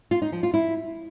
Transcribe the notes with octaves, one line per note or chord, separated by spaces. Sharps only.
F4
D#4
F3
F4
E4